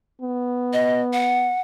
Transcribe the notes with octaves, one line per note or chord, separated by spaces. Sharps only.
B3
D#5
F#5